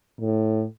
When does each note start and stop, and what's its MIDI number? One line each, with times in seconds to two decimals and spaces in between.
0.20 0.65 45